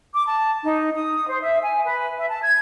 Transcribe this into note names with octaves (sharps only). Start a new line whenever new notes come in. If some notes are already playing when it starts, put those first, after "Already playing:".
D6
A5
D#4
D#6
C5
E5
G#5
B4
E5
A5
G#6